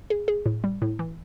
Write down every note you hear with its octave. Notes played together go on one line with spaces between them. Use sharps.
G#4
G#4
A2
G3
A2
E3